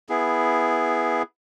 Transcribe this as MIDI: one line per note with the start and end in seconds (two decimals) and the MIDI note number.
0.09 1.23 59
0.09 1.23 64
0.09 1.23 68